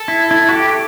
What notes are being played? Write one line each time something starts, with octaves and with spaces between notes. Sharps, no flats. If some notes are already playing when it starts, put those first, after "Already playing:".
Already playing: A4
E4
E4
F#4
G4